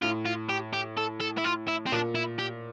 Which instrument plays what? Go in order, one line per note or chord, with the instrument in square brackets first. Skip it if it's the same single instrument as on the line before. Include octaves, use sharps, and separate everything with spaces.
[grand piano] A2 [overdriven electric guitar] F4
[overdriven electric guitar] F4
G4
G4
A4
A4
E4
F4
E4
C4
[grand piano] A#2 [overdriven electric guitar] D4
[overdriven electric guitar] E4
G4